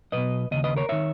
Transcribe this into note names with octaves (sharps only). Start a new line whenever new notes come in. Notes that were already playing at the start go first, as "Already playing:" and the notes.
B1 B2 B4 D#5
D#2 C#3 D#5
B4 D#5
A#4 C#5
D#3 C#5 E5